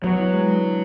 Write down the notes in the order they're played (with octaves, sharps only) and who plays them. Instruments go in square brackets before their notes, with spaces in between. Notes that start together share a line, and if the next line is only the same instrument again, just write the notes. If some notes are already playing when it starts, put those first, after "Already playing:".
[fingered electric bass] F#3 [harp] B3
[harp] E4
G#3
D3
D3